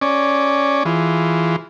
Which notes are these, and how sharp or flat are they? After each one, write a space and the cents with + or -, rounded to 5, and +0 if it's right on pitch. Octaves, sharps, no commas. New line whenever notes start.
C#4 +0 D5 +0
E3 +0 F4 +0 G#4 +0